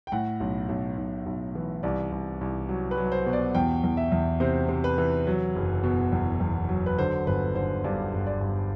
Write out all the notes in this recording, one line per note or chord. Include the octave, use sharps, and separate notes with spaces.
G5
A2 F#5
B1
B1
B1
B1
E3
C2 D5
C2
C2
F#3
B4
F#3
C5
B2
D5
E2 G5
E2
E5
E2
C3 C5
C3
B4
E3
F#3
F#1
B2
E2
E2
F#3
B4
D3 C5
G1 B4
D3 C5
G2 D5
G1
D5
G2